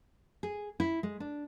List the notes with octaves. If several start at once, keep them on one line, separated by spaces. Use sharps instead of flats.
G#4
E4
G#3
D4